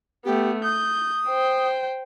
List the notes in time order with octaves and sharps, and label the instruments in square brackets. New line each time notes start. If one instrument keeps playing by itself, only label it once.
[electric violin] A3 B3 [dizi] G4
[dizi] D#6 [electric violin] G6
[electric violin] C5 G5